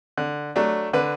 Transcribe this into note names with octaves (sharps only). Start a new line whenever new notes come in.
D3
F#3 A3 D4
D3 B4